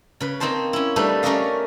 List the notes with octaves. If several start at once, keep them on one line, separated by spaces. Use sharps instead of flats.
C#3 B4
A#3 C4 D#4 C5 A5
C#4 E4
G3 A3 D4 D#4 A4 B4
A3 C#4 A#4 D5 D#5 F5